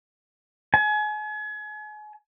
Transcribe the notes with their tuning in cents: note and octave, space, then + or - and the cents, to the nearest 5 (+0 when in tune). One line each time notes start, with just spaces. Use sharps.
G#5 +35